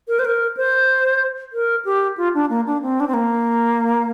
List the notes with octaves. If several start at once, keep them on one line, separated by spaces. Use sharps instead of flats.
A#4
C5
A#4
C5
A#4
G4
F4
D4
A#3
D4
C4
D4
C4
A#3